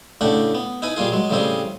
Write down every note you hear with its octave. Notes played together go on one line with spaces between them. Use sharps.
A2 C#3 A3 D4 G4 F#5
B3
D#4 E4 B4 G#5
A#2 G3 A#3 F4 G#4
F#3 G#3
A2 C#3 E3 G3 C4 G#4